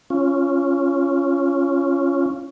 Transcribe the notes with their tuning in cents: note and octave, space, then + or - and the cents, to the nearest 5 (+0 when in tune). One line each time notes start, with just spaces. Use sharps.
C#4 +0 F4 -20